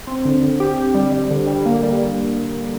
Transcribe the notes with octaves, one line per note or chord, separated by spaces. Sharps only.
C4
D3
D3
G4
G4
G3
G3
D3
G3
A#3
G3